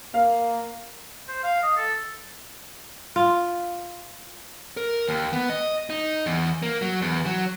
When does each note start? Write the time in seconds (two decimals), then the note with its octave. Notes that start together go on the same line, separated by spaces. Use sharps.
0.14 A#3 F5
1.28 C5
1.44 F5
1.63 D#5
1.77 A4
3.16 F4
4.77 A#4
5.08 D#2
5.33 B3
5.50 D#5
5.90 D#4
6.26 E2
6.63 A#3
6.82 F#3
7.02 E2
7.26 F#3